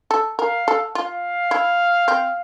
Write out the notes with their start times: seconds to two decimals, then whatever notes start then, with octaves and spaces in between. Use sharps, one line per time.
0.11 A4
0.39 A#4 F5
0.68 A4
0.95 F4 F5
1.51 E4
2.08 C4